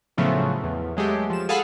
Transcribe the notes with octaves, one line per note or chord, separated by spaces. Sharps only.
A2 C#3 F3 F#3 A3 B3
E2
F#3 G#3 A3 G4
F3 E7
G#4 A4 F5 F#5 B5